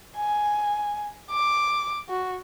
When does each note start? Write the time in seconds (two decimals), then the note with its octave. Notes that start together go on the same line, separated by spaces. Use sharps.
0.17 G#5
1.31 D6
2.09 F#4